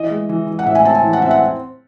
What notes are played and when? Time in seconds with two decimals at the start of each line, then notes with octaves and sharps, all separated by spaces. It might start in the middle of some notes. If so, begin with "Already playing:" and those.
Already playing: E3 D#5
0.10 G#3
0.29 E3
0.47 E3
0.59 F#5
0.66 A2 E5
0.75 G#5
0.85 C4 A5
0.95 G#5
1.03 E3
1.13 F#5
1.22 C4 E5
1.31 F#5